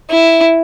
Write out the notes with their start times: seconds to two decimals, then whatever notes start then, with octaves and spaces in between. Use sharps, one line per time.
0.10 E4